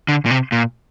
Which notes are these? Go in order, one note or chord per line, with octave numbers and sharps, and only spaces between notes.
D3
A#2
C3
A#2